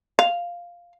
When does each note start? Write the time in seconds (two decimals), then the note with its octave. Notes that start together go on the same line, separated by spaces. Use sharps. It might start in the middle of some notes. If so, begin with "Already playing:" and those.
0.19 F5